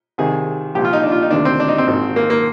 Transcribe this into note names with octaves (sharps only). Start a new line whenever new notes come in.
C2 C3 D#3 G#4
C2 A#2 F3 G4
F4
D#4
D4
F4
D#4
D2 C3 D#3 D4
C4
D4
D#4
C4
G#1 G#2 D#3
A#3
A#3